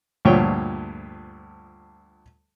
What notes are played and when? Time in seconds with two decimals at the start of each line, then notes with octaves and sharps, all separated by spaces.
0.25 D2 G2 A#2 F3 C#5 G5